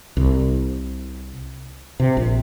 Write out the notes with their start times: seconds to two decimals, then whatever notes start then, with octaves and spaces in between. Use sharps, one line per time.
0.17 C2
2.00 C3
2.17 A#1